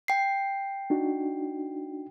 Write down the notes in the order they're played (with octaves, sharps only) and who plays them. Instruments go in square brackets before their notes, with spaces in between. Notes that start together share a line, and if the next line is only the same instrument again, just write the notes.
[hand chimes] G5 C7
[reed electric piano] D4 D#4 F#4